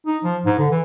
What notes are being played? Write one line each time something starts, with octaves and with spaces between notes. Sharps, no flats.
D#4
F3
G#2
D3
E3